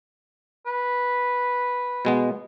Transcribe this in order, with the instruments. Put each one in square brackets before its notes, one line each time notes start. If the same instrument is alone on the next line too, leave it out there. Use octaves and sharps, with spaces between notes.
[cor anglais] B4
[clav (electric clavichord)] B2 G#3 B3